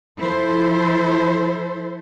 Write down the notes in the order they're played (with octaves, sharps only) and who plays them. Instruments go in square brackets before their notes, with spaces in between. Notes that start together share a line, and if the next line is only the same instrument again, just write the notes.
[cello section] F3 E4 A4 C5